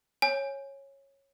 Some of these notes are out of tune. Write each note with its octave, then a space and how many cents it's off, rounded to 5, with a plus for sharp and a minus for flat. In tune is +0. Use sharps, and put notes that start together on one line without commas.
C#5 -15 G#5 +0